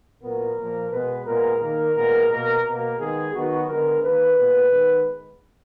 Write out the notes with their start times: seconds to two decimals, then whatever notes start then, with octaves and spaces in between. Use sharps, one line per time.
0.22 A#2 F#3 B3 A#4
0.57 A#2 F3 A#3
0.91 B2 G#3 B3 B4
1.25 A#2 G#3 B3 A#4
1.60 D#3 A#3 A#4
1.95 A#2 G#3 B3 A#4
2.29 B2 A#3 A#4
2.63 B2 A#3 A#4
2.98 D#3 G#3 B3 G#4
3.33 D#3 F#3 B3 F#4
3.68 D3 G#3 B3 A#4
4.02 D#3 A#3 B4
4.37 A#2 G#3 B3
4.72 D#3 G#3 B3